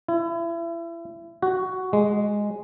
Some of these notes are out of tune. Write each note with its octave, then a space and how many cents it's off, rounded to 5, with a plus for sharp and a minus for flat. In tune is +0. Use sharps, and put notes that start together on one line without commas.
E4 +30
F#4 +10
G#3 -5